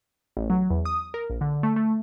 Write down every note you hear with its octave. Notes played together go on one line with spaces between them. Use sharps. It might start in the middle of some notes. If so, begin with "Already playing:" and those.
A1
F#3
E2
D#6
A#4
A#1
D3
A3
A3